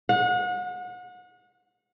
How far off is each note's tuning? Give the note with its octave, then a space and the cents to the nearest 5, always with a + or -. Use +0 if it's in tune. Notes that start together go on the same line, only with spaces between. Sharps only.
F#5 -35